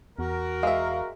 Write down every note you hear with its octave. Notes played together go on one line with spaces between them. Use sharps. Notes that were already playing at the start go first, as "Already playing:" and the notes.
E2 F#4 A#4
G#3 E5 F5